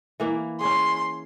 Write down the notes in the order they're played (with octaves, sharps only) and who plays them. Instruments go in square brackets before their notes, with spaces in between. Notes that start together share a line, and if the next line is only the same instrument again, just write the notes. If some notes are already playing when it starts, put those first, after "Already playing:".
[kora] E3 A#3 E4
[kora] C#4 G#4 [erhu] C6